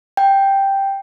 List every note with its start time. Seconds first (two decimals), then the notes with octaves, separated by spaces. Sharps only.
0.17 G5